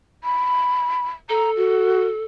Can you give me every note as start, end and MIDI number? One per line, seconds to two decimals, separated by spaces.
0.24 1.08 83
1.29 2.24 69
1.29 1.50 82
1.57 2.07 66